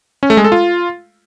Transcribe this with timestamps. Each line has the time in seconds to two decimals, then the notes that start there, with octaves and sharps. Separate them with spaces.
0.23 C#4
0.30 A3
0.37 G#3
0.44 A4
0.52 F4